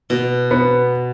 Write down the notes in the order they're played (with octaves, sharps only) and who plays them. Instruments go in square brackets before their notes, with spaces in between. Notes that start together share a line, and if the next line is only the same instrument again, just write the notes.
[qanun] B2
[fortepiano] B3